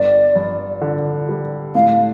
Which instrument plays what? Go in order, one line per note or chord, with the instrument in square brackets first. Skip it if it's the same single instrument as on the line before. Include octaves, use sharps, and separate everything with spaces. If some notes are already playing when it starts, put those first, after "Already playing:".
Already playing: [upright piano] G1 [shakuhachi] D5
[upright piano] G2
D3
G3
[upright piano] A2 [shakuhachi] F5